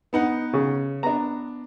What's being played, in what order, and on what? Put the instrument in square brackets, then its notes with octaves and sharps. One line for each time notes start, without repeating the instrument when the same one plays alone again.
[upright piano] B3 D#4 F#5
[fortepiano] C#3
[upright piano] B3 D4 [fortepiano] A#5